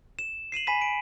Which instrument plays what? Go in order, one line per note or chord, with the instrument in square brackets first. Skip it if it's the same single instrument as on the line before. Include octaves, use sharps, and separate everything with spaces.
[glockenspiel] E7
C7 D#7 E7 F#7
G#5 B5 B6 D#7
D7